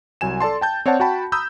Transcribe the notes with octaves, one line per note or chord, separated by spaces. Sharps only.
C2 F#3 G#5 E7
A4 D5 A5 C6
G5 A5 G6
C4 C#5 D5 F#5 A5
F#4 F#5 G5 A5 B5
A#5 B5 D#6 E6 G6